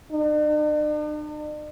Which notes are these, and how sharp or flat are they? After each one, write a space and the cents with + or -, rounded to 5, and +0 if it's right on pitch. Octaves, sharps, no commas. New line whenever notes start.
D4 +45